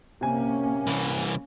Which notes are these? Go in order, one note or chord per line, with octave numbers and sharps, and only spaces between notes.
C3 A#3 C#4 G#5
C2 E3